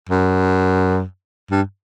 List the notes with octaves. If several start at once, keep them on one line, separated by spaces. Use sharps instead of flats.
F#2
G2